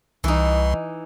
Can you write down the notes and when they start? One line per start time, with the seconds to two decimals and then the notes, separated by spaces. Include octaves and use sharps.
0.24 C2 E3 D#4